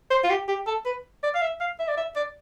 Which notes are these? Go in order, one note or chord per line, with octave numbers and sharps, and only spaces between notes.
C5
F4
G4
G4
A4
B4
D5
F5
E5
F5
E5
D5
E5
D5